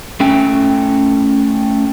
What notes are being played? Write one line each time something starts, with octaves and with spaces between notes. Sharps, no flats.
A3 C#4 G5